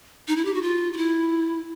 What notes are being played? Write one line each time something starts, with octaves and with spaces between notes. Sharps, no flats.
D#4
E4
G4
F#4
F4
F4
E4